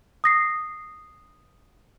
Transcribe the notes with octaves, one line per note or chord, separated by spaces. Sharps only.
D#6 A#6 C7